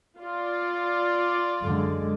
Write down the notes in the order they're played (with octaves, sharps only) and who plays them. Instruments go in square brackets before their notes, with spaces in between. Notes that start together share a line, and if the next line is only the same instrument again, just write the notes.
[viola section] F4 D5
[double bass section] F#2 D3 G#3